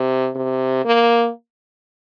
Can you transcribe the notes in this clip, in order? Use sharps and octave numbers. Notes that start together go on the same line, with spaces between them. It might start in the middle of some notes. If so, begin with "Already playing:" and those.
Already playing: C3
C3
A#3